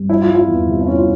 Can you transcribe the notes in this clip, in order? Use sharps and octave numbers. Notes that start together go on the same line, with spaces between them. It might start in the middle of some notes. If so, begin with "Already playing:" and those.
Already playing: G2
E3 E4
F4
G3
F4
E2
C3
E4
E3 C#4
F4